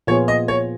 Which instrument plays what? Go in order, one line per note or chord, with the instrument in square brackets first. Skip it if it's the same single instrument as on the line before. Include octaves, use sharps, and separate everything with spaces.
[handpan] A#2 F3 B3 F4 G#4 [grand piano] C#5
[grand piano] D#5
C#5